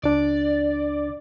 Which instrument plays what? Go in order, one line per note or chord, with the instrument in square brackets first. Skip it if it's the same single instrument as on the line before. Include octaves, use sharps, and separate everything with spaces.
[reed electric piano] C#2 D4 [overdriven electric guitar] D5